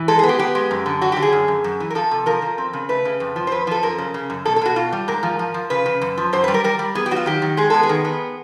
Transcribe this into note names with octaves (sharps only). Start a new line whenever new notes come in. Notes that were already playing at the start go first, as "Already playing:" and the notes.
Already playing: E3
G#3 A4
G#4
B3
G4
B3 G4
G#3
F#2
D3
F#3 F#4
G4
D3
G#4
F#2
F#2
F#2
E3
A#4
F3 A4
C3
F3 A#4
F3
C4
C#3
A3 B4
C#3
F2
F3
C5
F2 B4
F3 A4
F#2 A#4
C#3
C#3
F#2
B2 A4
A4
B2 F#4
B2 F4
G3
G#2 A#4
F3
F3
F3
C#3 B4
C#3
F#2
F3
F#2 C5
G3 B4
A#4
G3 A#4
G3
B3 G#4
G4
F#3 F#4
F4
D#3 G4
D#3
G#3 G#4
B3 A4
G#4
D#3
B3